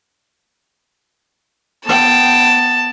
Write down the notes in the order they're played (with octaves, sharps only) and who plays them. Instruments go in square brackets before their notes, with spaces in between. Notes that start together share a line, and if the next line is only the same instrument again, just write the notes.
[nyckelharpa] B3 G5 [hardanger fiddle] A5